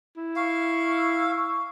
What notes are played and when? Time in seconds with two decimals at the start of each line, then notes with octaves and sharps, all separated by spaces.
0.17 E4
0.36 F5 C#6
0.96 E6
1.36 C#6